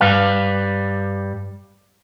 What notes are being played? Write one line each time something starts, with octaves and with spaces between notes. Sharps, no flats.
G2 G3 B4 F5